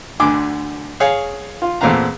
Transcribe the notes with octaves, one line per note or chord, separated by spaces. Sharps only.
D2 D3 G#5 D6
G#4 C#5 F5
F4
E2 A#2 A3 C4 F5 A#5